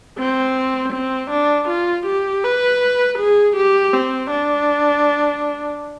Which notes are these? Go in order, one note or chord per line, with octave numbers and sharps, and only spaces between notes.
C4
C4
D4
F4
G4
B4
G#4
G4
C4
D4